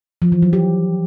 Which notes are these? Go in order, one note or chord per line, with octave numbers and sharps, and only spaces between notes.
F3
E3
F#3
G4